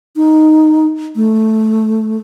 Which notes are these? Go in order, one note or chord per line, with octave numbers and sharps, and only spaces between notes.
D#4
A3